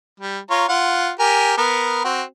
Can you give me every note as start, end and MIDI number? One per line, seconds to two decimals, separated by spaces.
0.20 0.39 55
0.50 0.66 65
0.50 0.66 73
0.50 0.66 82
0.69 1.10 65
0.69 1.10 78
1.20 1.53 67
1.20 1.53 70
1.20 1.53 80
1.57 2.00 59
1.57 2.00 70
2.05 2.22 60
2.05 2.22 66